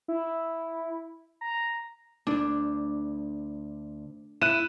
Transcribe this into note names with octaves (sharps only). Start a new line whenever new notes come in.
E4
A#5
D2 D4
E4 F#6 D#7 E7